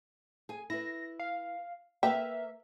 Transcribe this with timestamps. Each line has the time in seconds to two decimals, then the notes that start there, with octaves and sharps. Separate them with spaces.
0.49 G#4 G#5
0.70 E4 B4 A#6
1.20 F5
2.03 A#3 B4 E5 F5 G5